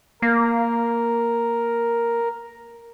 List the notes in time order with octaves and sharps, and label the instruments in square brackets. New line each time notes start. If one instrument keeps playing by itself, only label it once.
[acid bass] A#3 [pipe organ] A#4